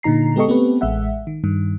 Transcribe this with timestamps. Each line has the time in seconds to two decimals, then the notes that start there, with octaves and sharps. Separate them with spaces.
0.03 A#2 D3 D#4 A#5 C7
0.36 G#3 B3 G4 A4 D#5 C#6
0.48 A3 B3 C4 G4 A4 B4
0.81 A1 G#3 E5 F#5
1.27 D#3
1.44 G2 D#3